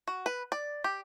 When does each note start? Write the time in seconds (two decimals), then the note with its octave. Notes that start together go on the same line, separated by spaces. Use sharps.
0.08 F#4
0.26 B4
0.52 D5
0.84 G4